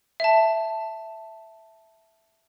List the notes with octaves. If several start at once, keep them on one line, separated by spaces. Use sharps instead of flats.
E5 A5